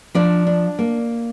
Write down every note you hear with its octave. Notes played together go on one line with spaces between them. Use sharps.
F3 D4 D5
D4
A#3